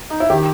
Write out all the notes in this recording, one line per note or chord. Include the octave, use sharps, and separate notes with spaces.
D#4
E4
D#3 G4